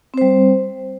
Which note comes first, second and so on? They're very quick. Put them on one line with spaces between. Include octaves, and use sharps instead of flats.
C4 C5 G3